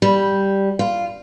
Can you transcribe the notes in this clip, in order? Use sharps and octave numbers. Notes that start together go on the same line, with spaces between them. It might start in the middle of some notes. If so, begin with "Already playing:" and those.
G3
F4